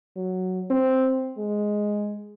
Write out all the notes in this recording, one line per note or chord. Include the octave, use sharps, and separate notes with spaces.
F#3
C4
G#3